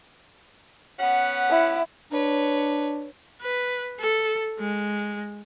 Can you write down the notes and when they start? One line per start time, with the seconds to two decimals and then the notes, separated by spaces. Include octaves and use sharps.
0.99 B3 C#4 F#5
1.50 E4
2.12 D4 B4 C#5
3.42 B4
4.00 A4
4.60 G#3